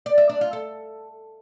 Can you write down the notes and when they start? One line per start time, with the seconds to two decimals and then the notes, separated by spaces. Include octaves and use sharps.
0.06 D5
0.18 E5
0.29 D4
0.41 F4
0.53 A4